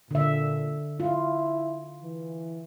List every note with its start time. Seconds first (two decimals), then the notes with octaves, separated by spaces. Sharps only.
0.11 A#2 D3 E5
1.00 E4 F4
2.03 E3